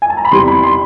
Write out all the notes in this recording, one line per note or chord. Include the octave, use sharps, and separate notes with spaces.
G#5
A5
A#5
B5
E2 C3 E3 G3 C6
B5
C6